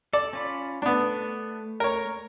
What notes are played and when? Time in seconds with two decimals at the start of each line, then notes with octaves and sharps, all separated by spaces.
0.13 A4 D5
0.33 C#4 F4 B5
0.82 A3 B3 D4
1.80 A#4 C#5